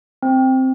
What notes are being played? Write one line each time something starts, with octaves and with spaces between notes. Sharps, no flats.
C4